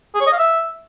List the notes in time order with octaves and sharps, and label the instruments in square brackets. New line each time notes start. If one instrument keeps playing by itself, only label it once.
[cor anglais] G#4
C#5
D#5
F5
E5